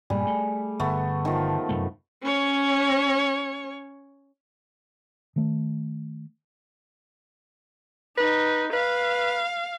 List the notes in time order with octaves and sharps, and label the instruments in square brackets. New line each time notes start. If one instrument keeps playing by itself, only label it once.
[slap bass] G2 A#2 [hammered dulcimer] G3 G#4
[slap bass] A3
[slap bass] G1 [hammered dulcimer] A3 B3
[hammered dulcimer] D#3 F3
[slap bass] F1 F#2 A3
[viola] C#4 C#5
[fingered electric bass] D#3 A3
[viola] D#4 [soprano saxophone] B4
[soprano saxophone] B4 [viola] F5